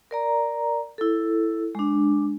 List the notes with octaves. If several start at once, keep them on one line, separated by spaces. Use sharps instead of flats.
A#4 D5 A#5
E4 A4
G#3 D4